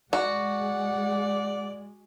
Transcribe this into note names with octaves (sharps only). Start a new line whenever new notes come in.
G#3 F#4 D5 F#5